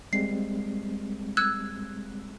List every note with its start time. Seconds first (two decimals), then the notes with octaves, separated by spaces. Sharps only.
0.13 G3 G#3 C4 C7
1.37 E6 F#6 G#6